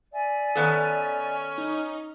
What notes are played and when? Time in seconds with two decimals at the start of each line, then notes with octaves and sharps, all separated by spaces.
0.13 D5 E5 G#5
0.55 D#3 B3 C#4 A4
1.58 D#4